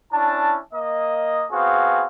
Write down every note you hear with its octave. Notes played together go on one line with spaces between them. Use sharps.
C#4 D4 E4 A5
A#3 D#5
B3 C4 F#4 G#4 F5